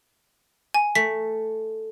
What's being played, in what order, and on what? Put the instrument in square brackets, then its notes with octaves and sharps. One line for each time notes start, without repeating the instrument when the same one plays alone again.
[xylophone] G#5
[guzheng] A3 [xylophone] B6